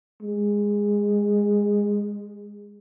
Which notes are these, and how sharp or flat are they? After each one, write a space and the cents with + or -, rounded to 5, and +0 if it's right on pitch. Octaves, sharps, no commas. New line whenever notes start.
G#3 -15